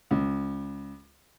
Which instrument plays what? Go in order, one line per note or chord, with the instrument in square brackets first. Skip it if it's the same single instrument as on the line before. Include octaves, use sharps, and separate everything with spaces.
[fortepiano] C#2